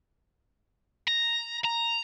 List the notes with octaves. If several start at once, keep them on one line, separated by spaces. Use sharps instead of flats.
A#5
A#5